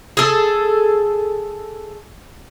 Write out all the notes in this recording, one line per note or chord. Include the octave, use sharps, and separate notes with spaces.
G#4 A4